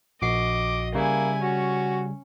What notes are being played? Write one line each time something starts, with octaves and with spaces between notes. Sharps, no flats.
A#1 F#4 D#5 D6 C7
C#3 G3 A#3 E4 G#5
C#4 F#4